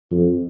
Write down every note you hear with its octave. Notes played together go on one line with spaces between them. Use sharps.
F2